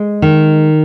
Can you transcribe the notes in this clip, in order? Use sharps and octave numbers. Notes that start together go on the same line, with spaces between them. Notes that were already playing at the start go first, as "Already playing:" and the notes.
Already playing: G#3
D#3